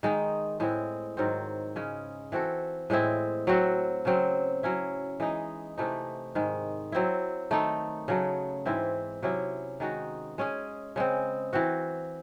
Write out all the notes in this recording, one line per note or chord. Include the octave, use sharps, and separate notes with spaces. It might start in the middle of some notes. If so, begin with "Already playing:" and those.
D#3 G#3 D#4
A2 G#3 C4 E4
G#2 D#3 F#3 C4
C#3 G#3 C#4
E3 C4 F#4 A4
A2 G#3 C4 E4
F#3 C4 F#4
C#3 F#3 C4
F#3 C#4 E4
E3 G#3 D#4
C3 E3 A3 D#4
G#2 D#3 G#3
F#3 C4 E4
D#3 A3 D#4 A4
C#3 F#3 A3
G#2 E3 C4 E4
C3 F#3 C#4 E4
D#3 G#3 D#4 F#4
G#3 C#4 G#4
C#3 G#3 C4
E3 C4 F#4